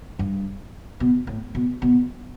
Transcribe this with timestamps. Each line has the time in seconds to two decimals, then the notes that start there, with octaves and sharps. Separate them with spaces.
0.19 G2
1.00 B2
1.27 A2
1.55 B2
1.82 B2